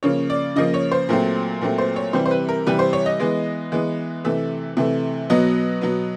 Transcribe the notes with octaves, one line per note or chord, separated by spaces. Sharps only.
C#3 F3 A#3 C#5
D5
C#3 F3 A#3 D#5
C#5
C5
A#2 F#3 A3 C4
A#2 F#3 A3 C4
C5
C#5
C3 E3 G3 C5
C5
B4
A#4
C3 E3 G3 B4
C5
C#5
D#5
E3 G#3 B3
E3 G#3 B3
C3 E3 A3 E5
C3 E3 A3
B2 F#3 B3 D#5
B2 F#3 B3